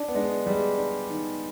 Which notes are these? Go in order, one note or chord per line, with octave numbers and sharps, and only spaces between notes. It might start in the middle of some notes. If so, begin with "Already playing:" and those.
Already playing: D4
B3
G#3 D4
G3 G#3
D4
D#3